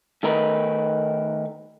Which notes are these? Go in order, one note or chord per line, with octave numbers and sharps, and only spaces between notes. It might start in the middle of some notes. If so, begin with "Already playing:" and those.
D#3 A3 D#4 A#4 B4